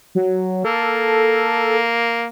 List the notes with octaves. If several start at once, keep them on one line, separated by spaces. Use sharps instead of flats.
F#3
A#3 A4